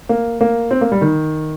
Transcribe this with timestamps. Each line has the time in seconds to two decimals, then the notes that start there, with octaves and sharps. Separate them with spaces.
0.09 A#3
0.41 A#3
0.71 C4
0.81 A#3
0.92 G3
1.01 D#3